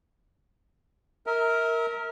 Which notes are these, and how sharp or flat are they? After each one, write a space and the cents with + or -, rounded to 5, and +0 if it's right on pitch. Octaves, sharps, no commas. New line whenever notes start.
A#4 -5 E5 -35